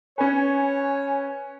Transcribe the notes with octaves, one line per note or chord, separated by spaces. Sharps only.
C#4 B4 C#5 G#5